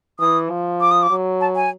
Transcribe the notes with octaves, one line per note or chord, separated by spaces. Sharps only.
E3 D#6
F3
D6
D#6
D6
F#3
A5
G#5